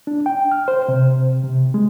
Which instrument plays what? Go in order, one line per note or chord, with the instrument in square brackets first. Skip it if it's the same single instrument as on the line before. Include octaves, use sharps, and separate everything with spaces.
[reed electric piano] D4
G5
F6
C5
C3
C3
G#3